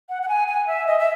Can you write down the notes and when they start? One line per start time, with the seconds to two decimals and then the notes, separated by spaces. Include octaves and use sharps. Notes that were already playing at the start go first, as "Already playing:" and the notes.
0.09 F#5
0.23 F#5
0.28 G#5
0.48 G#5
0.67 E5
0.87 D#5
0.99 E5